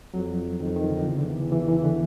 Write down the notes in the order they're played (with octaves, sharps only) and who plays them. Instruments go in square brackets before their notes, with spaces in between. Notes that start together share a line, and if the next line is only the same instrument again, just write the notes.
[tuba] F2 [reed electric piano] F#3
[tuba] F2 [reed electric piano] D#3
[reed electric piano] D#3
D3
[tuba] E2 [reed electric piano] C#3
[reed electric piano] D3
D#3
E3
E3
E3
D3